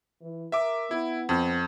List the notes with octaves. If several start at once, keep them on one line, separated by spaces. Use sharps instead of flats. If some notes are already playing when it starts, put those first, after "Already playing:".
E3
A#4 E5 D6
B3 E4
F2